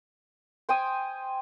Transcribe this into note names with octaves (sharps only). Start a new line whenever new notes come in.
C5 G5 G#5 D#6